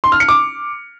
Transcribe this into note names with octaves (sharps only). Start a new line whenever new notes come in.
C6
F6
C#7
D6